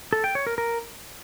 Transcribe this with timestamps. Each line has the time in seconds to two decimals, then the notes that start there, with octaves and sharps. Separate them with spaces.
0.13 A4
0.24 G5
0.35 C#5
0.47 A#4
0.58 A#4